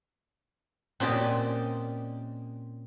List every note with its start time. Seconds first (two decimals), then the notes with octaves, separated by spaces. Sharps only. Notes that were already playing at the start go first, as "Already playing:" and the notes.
1.00 A#2 C4 C#4 G4 D5 D#5